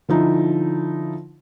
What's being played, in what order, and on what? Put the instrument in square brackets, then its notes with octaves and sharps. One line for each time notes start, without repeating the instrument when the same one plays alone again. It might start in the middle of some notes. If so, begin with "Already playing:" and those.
[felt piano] D3 F3 D#4 E4